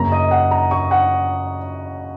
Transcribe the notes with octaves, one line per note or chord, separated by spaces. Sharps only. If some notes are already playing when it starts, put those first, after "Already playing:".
Already playing: F#2 C#3 A#3 A#5
D#5
F#5
A#5
C#6
F#5